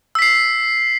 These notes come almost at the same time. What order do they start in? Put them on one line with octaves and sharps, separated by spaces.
E6 B6 C7